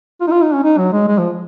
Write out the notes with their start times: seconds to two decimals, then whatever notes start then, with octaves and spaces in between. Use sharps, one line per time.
0.21 F4
0.27 D#4
0.31 F4
0.42 D#4
0.54 C#4
0.64 D#4
0.78 F#3
0.93 G#3
1.08 G#3
1.18 F3